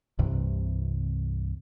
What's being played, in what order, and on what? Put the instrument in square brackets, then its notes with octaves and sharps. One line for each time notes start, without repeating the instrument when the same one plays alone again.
[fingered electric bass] C2 G2 C3 E3